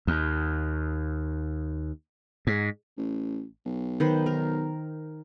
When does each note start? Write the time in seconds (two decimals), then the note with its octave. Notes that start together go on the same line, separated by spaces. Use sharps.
0.07 D#2
2.47 G#2
2.97 A1
3.66 B1
4.00 D#3 B4 C5
4.26 A#4